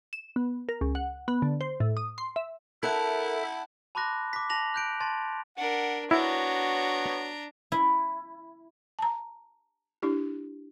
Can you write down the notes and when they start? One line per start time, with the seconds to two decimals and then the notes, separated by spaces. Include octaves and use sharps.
0.13 E7
0.36 B3
0.69 A#4
0.81 C#2
0.95 F#5
1.28 B3
1.42 D3
1.61 C5
1.80 A2
1.97 D#6
2.18 C6
2.36 E5
2.83 E4 A4 A#4 E5 F#5 A5
3.95 A5 B5 C6 D6 F#6 A#6
4.33 D6 B6
4.50 A5 A#6 F7 F#7
4.74 F#6 G6 D7
5.00 A5 C6 A6
5.57 D4 A#4 F#5
6.11 B3 D4 E4 F#4 C#5 A#5 C#6
7.72 E4
8.99 A5 A#5
10.02 D4 E4 G4